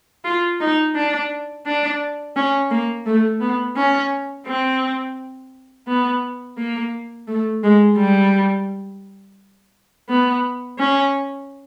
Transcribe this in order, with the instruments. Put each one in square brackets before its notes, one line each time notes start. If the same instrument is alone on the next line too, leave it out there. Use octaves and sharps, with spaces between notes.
[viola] F4
D#4
D4
D4
C#4
A#3
A3
B3
C#4
C4
B3
A#3
A3
G#3
G3
B3
C#4